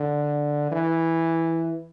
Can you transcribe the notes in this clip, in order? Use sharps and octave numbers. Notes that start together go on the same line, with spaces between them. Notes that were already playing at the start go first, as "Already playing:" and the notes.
Already playing: D3
E3